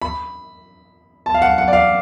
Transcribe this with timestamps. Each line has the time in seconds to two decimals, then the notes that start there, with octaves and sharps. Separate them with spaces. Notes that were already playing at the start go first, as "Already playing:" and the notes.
0.02 B5
1.26 A5
1.34 F5
1.42 F#5
1.58 F#5
1.68 D5
1.73 F5